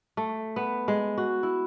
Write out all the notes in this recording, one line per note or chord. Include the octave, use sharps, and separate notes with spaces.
A3
B3
G#3
F#4
E4